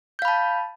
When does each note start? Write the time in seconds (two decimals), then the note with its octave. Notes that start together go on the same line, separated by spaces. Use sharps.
0.19 G6
0.22 F5
0.25 B5
0.28 A5